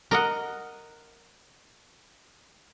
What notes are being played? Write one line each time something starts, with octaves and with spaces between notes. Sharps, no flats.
A#4 D#5 F#5